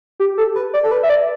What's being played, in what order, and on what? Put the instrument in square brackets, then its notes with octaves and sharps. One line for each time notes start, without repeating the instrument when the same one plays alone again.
[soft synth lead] G4
A4
B4
D5
A4
B4
E5
D5